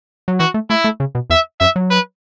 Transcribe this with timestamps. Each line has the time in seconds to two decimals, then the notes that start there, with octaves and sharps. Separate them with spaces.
0.28 F#3
0.39 E3 F#4
0.54 A3
0.70 A3 E4
0.84 A3
1.00 C#3
1.15 B2
1.30 E2 E5
1.60 F#2 E5
1.76 F#3
1.90 B4